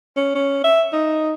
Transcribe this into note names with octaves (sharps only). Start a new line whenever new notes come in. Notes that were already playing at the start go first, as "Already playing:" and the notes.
C#4
C#4
E5
D#4